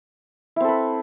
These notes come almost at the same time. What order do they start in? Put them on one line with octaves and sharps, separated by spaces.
E4 C4 A4 B4